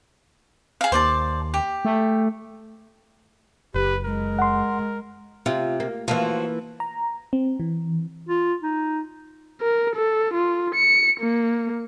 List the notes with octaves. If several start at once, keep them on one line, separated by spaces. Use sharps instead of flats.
G#4 F5
D#2 C5 D5 A5
G4
A3
F#1 G4 B4
G#3 A#4
F#5 C6
C3 F4
A#3
E3 F3 A#3 F4 F#4
A#5
C4
E3
F4
D#4
A#4
A4
F4
C#7
A#3